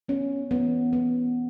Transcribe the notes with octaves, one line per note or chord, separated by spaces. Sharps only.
B3 C#4
E3 B3
B3